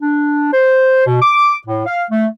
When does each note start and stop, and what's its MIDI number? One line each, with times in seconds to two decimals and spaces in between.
0.02 0.48 62
0.53 1.05 72
1.07 1.18 47
1.22 1.56 86
1.67 1.83 45
1.86 2.04 77
2.10 2.27 57